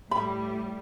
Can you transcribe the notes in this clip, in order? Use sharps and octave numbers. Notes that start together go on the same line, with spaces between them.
A2 G3 B5